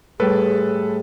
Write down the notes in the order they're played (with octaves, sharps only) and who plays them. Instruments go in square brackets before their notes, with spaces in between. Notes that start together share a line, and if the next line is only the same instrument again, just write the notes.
[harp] A2 G3 [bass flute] G#4 [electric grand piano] A4 B4